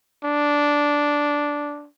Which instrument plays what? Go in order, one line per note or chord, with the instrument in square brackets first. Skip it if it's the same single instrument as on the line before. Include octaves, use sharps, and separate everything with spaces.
[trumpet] D4